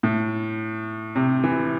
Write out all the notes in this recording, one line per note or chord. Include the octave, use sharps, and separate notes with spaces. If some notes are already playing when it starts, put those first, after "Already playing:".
A2
C3
E3